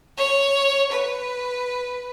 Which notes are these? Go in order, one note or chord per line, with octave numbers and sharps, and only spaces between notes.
C#5
B4